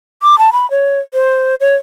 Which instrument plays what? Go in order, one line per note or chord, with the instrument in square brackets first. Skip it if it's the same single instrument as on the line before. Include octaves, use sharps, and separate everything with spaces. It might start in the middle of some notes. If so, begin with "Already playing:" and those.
[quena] D6
A5
B5
C#5
C5
C#5